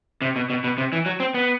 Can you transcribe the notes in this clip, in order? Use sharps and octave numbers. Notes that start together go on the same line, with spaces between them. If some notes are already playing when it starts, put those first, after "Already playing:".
C3
B2
B2
B2
C3
E3
F#3
C4
B3